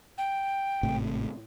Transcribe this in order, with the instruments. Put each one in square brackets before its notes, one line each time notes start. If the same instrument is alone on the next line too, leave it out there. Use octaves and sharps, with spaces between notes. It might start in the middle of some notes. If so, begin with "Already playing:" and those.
[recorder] G5
[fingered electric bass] G#1 A2 C3